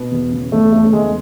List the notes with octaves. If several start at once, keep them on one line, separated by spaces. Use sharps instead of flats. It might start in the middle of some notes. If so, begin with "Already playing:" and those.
Already playing: B2 B3
E2
C#3
E2 A3
C#3 A3
A3
E2 G#3